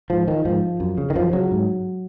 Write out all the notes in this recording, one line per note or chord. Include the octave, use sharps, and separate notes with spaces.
G#2 F3
D#3
G#2 F3
F#2
C#3
D#3
F#2 F3
C#3 F#3
G#2